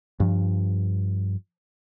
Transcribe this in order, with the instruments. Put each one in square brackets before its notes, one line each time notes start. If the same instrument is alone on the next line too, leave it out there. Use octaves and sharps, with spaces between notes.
[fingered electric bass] G2 F3